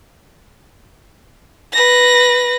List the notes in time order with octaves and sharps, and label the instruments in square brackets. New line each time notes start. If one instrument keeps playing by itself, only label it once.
[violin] B4 A#6